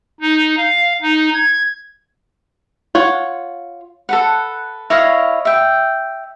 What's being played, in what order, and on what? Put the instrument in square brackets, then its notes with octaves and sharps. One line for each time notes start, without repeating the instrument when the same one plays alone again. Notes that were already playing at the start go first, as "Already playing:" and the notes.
[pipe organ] D#4
F5
D#4
G#6
[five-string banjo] F4 C#5 F#5
[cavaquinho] A4 B4 F#5
E4 C#5 D#5 F5
E5 G5